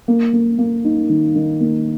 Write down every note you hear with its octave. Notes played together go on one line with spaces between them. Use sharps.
A#3
A#3
A#3
D#4
D#3
D#3
A#3